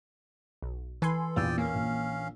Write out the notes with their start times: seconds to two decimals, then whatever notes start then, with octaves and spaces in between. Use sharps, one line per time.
0.63 B1
1.02 E3 A4 B4 G#5 C6
1.36 A#1 E2 F4 D5 G5 D#6 E6
1.58 A#3 C#4 F5
1.74 A#1